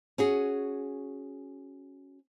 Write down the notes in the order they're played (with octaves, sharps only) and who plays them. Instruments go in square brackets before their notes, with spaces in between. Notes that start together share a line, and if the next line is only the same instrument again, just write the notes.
[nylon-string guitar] C#4 F#4 G#4